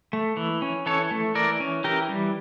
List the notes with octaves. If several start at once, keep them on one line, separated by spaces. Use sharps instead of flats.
A3
E3
C#4
E3 A4 C#5
A3
E3 A#4 D5
C#4
E3 G4 A#4
G3